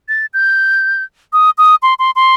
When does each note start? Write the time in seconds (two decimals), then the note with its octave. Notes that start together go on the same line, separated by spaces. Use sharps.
0.09 A6
0.34 G6
1.33 D#6
1.58 D#6
1.83 C6
1.99 C6
2.16 C6